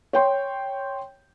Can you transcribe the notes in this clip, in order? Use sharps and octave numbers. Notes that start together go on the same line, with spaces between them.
C#5 G5 C6